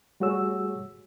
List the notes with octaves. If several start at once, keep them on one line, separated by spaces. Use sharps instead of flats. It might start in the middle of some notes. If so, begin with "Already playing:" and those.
G3 A3 F#4 G#4 C#5 E6